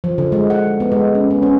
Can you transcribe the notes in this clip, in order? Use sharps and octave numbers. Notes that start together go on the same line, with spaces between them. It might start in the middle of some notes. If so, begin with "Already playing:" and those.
F3
D3
G#3
F#5
B3
G#3
C#4
B3
C#4